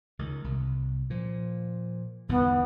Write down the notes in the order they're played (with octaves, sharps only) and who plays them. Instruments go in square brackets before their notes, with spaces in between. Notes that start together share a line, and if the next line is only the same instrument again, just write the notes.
[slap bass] C#2 D#3
C2
A#2 F3
[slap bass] G1 E2 G#2 [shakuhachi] B3